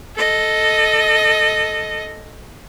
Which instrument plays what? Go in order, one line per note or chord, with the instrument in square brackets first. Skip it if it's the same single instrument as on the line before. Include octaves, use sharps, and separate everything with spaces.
[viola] A4 D#5